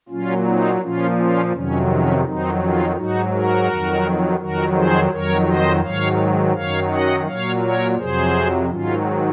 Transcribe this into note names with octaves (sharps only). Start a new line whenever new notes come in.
A#2 F#3 C#4 F4
C4 D#4
A#2 F3 C#4 F4
C#4 F4
F2 C3 D#3 F#3 C#4
C#4
F2 D#3 F#3 C4 D#4
C#4 F4
G#2 F#3 D#4 F#4
F#4 A#4
F2 D#3 F#3
F2 D#3 F#3 F#4 A#4
G#4 C5
F2 D#3 F#3 A#4 C#5
C5 D#5
G#2 D#3 F#3 C#5 F5
F#2 D#3 F#3 C#5 F5
D#5 F#5
A#2 F#3 C#5 F5
A#4 C#5
F2 C3 F#3 G#4 C5
G#2 D#3 F#3 C#4 F4